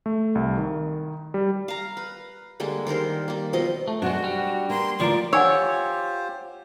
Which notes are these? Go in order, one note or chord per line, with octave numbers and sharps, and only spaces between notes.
A3
C2
D#3
G3
F5 A#5
B4
D3 G3 G#3 A#3
D#3 G3 A#4 C5
G3 A#3
B2 F3 C4 D#5
A3
F#2 B2 G#3 D4 F#4 C5
G3
A#3 C6
D2 E3 F3 A#3 F4 D5 A#5
F4 G4 C5 C#5 F#5 G#5 E6